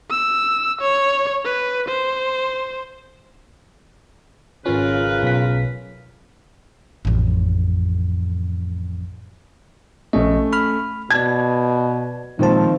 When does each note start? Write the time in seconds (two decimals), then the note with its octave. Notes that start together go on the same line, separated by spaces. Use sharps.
0.11 E6
0.81 C#5
1.45 B4
1.89 C5
4.66 G#1 C#3 C#4 F4 A#4 B4
5.23 B1 B6
7.05 A1 F2
10.13 A#1 A3 C#4 D#5
10.53 B5 F6
11.10 B2 D5 A5 G#6
12.39 A#2 D#3 F3 G#3 C4 A5